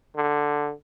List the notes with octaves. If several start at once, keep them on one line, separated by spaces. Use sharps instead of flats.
D3